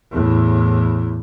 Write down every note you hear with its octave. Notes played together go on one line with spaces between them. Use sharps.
E2 A2